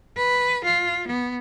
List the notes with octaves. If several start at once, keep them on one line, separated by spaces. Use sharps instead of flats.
B4
F4
B3